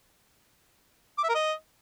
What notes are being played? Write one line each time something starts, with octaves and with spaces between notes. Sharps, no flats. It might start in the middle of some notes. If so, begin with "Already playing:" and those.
D6
E5
A#4
D#5